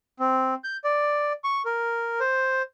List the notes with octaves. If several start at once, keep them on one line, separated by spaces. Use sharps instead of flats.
C4
G6
D5
C#6
A#4
C5